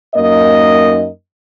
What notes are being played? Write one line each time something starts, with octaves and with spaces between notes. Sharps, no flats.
F#2 A#3 D#4 A#4 D#5